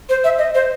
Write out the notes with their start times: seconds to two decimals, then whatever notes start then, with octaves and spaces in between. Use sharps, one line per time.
0.09 C5
0.24 E5
0.38 D#5
0.55 C5